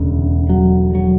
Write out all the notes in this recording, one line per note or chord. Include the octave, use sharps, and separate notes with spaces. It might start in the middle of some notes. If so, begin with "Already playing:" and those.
Already playing: E1 D2 C#3
F#3
F#3